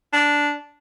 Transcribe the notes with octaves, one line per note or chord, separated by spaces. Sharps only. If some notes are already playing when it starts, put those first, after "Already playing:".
D4